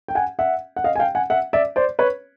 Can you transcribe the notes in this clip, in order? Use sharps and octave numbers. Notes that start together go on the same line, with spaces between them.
G5
F#5 G#5
E5 F#5
F#5
D#5 F5
G#5
F5 G5
F#5 G#5
E5 F#5
D5 E5
C5 D5
B4 C#5